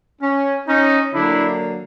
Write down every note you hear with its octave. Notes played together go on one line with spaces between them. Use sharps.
C#4
C#4 D#4
D3 F#3 A#3 D4 E4